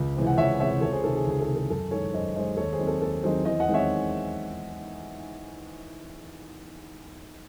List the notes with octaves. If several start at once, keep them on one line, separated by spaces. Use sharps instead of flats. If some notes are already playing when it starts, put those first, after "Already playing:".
Already playing: C#2
C3 E3 G#3 C4
F#5
C#2 C#5 E5
C3 E3 G#3 C4 C#5 E5
C#2 A4 C#5
G#4 C5
C3 D#3 A4
G#4
C#2 G#4
A4
C3 D#3
A4
F#2 A4
D#3 G#3 A4 C#5
F#2 C5 D#5
D#3 G#3 C5 D#5
D#2 A4 C#5
G#4 C5
D#3 F#3 C4 D#4
A4
D#2 A4
D#3 F#3 C4 D#4 G#4 C5
E2 C5 D#5
D#5 F#5
D#3 G#3 C4
C#5 E5